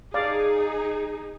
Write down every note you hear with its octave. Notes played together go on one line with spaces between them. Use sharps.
D#4 G#4 D5 F5